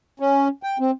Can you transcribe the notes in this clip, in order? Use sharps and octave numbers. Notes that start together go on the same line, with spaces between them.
C#4
G5
C4